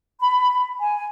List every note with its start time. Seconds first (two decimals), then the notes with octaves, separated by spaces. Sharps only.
0.21 B5
0.80 G#5